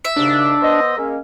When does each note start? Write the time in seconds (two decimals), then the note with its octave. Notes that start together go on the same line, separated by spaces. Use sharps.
0.05 E5
0.16 D#2 G#2 C#3 D4
0.61 B3 C5 D#5
0.97 G#3 A#3 C#4